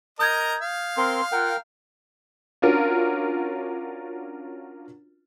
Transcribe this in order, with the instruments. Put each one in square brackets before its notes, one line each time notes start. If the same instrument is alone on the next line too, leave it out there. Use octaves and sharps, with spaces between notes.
[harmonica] A#4 D#5 A#5 [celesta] D#6 G6 G#6
[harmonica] F5
[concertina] C4 A#4 [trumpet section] C6
[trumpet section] F4 F#5 [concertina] A#4 G5
[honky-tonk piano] C#4 D4 F4 F#4 A#4